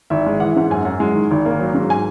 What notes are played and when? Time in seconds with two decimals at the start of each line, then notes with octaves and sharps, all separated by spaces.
0.10 G#1 E5
0.26 G#3
0.40 E3 F#5
0.50 E5
0.56 G#2 F#5
0.71 F#2 G#5
0.85 F#2 F#5
1.00 G#3
1.15 D#3
1.31 G#1
1.46 A#3
1.59 F#3
1.74 G#2
1.90 G#5